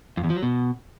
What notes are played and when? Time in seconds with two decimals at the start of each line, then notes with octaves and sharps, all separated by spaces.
0.17 F2
0.24 E2
0.30 F3
0.36 F#3
0.43 B2